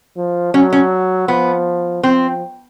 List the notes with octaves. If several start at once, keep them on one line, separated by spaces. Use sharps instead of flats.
F3
F#3 C#4
C#4
F3 B3
F3 C4